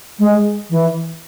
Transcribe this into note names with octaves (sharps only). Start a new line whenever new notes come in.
G#3
E3